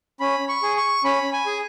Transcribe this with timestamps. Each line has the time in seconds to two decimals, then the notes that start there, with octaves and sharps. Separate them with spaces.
0.20 C#4 B5
0.49 C#6
0.63 G#4
0.77 C#6
1.04 C#4 B5
1.33 G#5
1.46 G#4